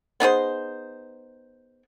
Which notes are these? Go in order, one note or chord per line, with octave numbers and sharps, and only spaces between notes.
B3 D#4 G#4 C5